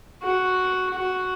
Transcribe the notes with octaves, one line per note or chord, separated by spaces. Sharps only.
F#4
F#4